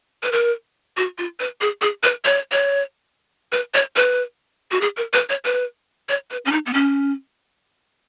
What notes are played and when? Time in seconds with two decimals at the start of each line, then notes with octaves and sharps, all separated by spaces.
0.23 B4
0.32 A#4
0.97 F#4
1.18 F4
1.40 B4
1.61 G#4
1.82 G#4
2.03 B4
2.25 C#5
2.52 C#5
3.52 B4
3.75 C#5
3.96 B4
4.71 F#4
4.81 G#4
4.97 A#4
5.13 B4
5.30 C#5
5.45 B4
6.09 C#5
6.31 B4
6.46 C#4
6.52 D#4
6.66 B3
6.74 C#4